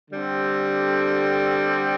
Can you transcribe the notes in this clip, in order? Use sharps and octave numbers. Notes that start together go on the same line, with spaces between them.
D3 G3 C4